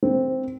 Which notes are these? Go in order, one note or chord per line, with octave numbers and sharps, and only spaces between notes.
C4